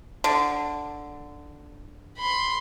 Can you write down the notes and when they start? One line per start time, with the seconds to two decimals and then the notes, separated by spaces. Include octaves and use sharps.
0.24 D3
2.17 B5 C6